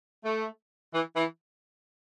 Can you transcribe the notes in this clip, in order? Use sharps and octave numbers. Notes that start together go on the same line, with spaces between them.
A3
E3
E3